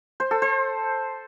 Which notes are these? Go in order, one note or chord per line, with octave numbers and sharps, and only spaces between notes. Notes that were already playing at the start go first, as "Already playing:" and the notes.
C5
A4
C5